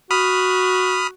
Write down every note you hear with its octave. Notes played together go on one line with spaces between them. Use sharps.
F#4 B5 D#6 F6